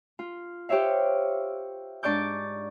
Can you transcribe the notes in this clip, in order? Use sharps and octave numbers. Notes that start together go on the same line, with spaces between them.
F4
G4 C5 C#5 E5 F5
G#2 D4 D5 C#6 D6 G6